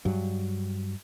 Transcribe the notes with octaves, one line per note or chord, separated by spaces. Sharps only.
G2 F#3